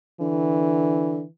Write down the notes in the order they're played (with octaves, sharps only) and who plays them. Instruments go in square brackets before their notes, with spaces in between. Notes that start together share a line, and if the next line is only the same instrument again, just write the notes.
[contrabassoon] D3 [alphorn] E3